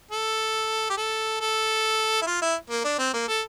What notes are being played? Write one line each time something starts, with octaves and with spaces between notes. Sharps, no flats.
A4
G4
A4
A4
E4
F4
E4
A#3
D4
C4
A#3
A4